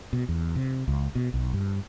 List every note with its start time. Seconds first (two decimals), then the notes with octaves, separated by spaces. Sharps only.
0.13 B2
0.29 E2
0.56 C3
0.88 C#2
1.15 B2
1.34 B1
1.54 G2